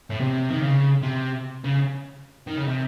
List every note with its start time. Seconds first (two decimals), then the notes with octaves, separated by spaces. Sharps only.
0.10 A2
0.20 C3
0.49 D#3
0.61 C#3
1.02 C3
1.64 C#3
2.47 D#3
2.56 C#3
2.67 C3